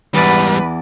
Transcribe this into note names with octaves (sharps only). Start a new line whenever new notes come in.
E2 G#2 G3 B4 D5